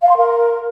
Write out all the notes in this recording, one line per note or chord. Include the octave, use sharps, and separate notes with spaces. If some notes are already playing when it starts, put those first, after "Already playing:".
F5
C6
A#4